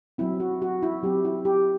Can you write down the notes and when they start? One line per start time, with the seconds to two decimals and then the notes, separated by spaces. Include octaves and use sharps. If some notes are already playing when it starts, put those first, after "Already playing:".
0.18 F#3 C4 E4
0.40 F#4
0.62 F#4
0.83 E4
1.03 F#3 C4 G4
1.25 E4
1.45 G4